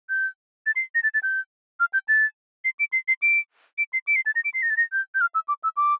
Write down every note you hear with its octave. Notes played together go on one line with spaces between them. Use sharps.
G6
A6
C7
A#6
A6
A6
G6
F6
G6
A6
C7
D7
C7
C7
D7
D7
C7
D7
C7
A6
A#6
D7
C7
A#6
A6
A#6
G6
G6
F6
E6
D6
E6
D6